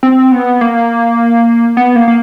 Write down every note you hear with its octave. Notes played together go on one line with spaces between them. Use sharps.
C4
B3
A#3
B3
A#3
A#3